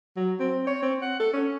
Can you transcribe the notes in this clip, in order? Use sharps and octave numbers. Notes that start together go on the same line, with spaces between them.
F#3
C4
C#5
C4
F#5
A4
C#4